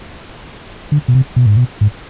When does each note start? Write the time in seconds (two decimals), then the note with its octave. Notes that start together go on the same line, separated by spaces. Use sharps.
0.92 D3
1.08 B2
1.15 C3
1.36 B2
1.46 G#2
1.57 B2
1.81 G#2